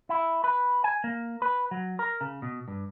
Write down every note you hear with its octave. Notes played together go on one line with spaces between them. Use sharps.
E4
B4
G#5
A#3
B4
F#3
A#4
C#3
B2
G2